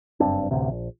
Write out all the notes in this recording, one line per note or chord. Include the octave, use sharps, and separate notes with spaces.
F#1 G2 C4 D4
A1 D2 C3
A#1